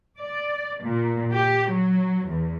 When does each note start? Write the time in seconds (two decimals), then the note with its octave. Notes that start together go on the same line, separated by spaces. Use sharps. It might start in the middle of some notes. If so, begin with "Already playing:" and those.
0.19 D5
0.83 A#2
1.32 G4
1.71 F#3
2.28 E2